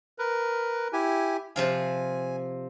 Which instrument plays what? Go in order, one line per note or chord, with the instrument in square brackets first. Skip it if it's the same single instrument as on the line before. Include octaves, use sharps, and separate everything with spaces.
[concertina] A#4 B4
E4 G4 G#5
[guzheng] C3 F3 F5 [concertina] G#5